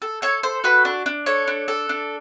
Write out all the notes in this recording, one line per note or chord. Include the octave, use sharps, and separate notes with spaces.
A4
A4 C#5
A4 C5
F#4 B4
D4
D4
A4 C#5
D4
A4
D4